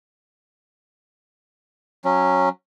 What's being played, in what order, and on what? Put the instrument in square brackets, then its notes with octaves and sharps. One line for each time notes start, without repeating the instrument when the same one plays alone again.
[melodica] F#3 C#4